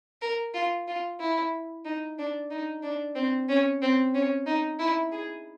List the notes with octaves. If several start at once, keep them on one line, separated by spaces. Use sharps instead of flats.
A#4
F4
F4
E4
D#4
D4
D#4
D4
C4
C#4
C4
C#4
D#4
E4
G#4